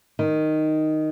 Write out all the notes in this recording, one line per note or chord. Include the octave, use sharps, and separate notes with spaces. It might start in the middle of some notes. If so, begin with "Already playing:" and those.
D#3